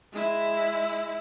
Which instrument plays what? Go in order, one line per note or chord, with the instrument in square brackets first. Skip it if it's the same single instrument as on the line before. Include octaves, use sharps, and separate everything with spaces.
[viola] G#3 E4